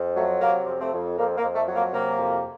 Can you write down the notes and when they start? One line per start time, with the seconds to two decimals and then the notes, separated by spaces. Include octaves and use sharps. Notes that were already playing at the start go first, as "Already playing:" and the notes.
Already playing: F2
0.16 F#3 A3
0.41 C3 A#3
0.67 F2
0.80 A3 C4
0.93 F2
1.18 F2 A#3
1.37 A#3
1.42 F2
1.55 A3
1.68 F#3
1.75 A#3
1.93 C3 A#3
2.18 F2